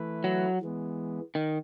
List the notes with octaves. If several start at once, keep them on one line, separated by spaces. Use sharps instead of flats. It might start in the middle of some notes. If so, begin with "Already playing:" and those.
Already playing: E3 A3 E4 B4
F#3
E3 G#3 B3
D#3